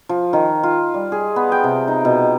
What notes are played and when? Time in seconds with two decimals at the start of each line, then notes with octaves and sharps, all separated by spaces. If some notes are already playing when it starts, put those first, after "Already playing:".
0.09 F3
0.33 D#3
0.63 F4
0.94 G3
1.12 G#4
1.36 B3
1.52 G5
1.64 C3
1.88 D#4
2.05 B2